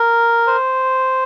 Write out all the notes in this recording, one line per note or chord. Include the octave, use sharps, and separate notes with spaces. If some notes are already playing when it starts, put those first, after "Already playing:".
Already playing: A#4
C5